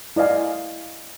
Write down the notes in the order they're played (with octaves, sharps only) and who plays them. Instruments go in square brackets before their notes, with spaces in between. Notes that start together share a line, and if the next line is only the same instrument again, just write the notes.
[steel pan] E4 D5 D#5 F5 G#5